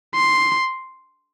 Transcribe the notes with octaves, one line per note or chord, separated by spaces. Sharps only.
C6